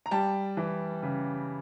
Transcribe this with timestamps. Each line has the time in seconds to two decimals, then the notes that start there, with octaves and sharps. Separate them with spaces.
0.06 A#5
0.11 G3 G5 A5
0.57 E3
1.03 C#3